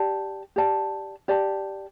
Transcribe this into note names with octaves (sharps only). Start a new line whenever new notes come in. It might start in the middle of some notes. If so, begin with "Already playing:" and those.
Already playing: G4 D5 A5
G4 D5 A5
G4 D5 A5